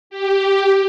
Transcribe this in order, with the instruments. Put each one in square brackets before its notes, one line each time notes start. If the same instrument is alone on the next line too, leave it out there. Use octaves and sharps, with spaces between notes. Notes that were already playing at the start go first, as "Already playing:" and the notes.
[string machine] G4